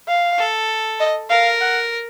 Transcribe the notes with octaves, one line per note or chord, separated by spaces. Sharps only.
F5
A4
D#5
A#4 F5
F#5